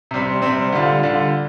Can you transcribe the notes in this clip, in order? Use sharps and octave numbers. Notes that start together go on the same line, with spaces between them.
C3 G3 C4
C3 G3 C4
D3 G3 D4 F4
D3 G3 D4 F4